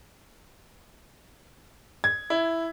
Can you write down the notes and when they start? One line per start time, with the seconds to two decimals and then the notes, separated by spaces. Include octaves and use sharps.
2.04 G#6
2.30 E4